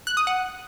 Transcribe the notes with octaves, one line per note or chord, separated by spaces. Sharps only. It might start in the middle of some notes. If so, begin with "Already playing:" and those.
F#6
D#6
F#5